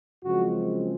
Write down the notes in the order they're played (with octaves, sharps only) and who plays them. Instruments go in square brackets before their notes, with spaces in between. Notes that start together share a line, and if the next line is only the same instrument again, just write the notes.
[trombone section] F#2 C#3 F3 G#3 C4 F#4